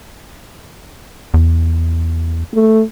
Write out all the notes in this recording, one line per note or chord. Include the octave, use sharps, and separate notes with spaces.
E2
A3